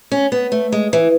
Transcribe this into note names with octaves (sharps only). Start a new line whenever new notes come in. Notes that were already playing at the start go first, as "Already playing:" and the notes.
C#4
B3
A3
G#3
E3